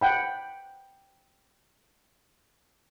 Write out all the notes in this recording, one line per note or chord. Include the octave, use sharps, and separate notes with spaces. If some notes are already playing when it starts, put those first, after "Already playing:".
F#5 G5 B5